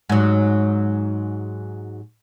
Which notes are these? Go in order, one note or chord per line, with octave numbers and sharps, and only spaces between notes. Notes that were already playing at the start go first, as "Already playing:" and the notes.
G#2 F#3